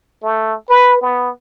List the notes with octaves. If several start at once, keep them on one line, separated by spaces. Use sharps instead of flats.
A3
B4
B3